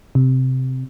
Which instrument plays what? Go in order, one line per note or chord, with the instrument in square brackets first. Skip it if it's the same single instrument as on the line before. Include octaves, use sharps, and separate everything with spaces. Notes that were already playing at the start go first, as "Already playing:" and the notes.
[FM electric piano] C3